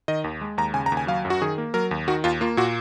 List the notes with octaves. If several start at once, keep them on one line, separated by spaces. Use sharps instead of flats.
D#3 D#5
D#2
G#3
D#2 A#5
C#3 G#5
A#5
D#2
G#5
F#3 F5
F#2
F#4
D#3 G#4
A#3
F#3 A#4
D#2
D#3 F#4
D#2 F4
A#3 F4
A#2 F#4